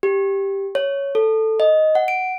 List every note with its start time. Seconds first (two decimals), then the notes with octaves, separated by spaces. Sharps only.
0.03 G4
0.75 C#5
1.15 A4
1.60 D#5
1.95 F#5
2.08 D7